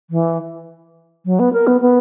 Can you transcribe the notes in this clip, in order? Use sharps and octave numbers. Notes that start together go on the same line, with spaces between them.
E3
F#3
B3
A#4
B3
B3